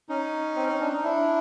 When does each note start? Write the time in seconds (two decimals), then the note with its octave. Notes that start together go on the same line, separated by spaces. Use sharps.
0.09 C#4 D#4
0.56 C4
0.68 C#4
0.81 D4
0.93 D#4
1.04 D4 E4